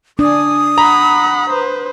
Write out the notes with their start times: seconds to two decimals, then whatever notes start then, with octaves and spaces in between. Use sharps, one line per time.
0.19 D4 D5 G#5 D#6
0.78 F#5 A#5 B5
1.50 B4 C5